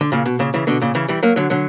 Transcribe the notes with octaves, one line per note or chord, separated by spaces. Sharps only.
D3
A#2 C#3
B2
A#2 C#3
C#3 E3
B2 D3
A#2 C#3
C#3 E3
E3 G3
F#3 A#3
D3 F#3
D3 F#3